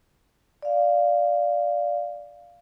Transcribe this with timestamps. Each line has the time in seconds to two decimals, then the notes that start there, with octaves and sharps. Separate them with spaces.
0.62 D5 F5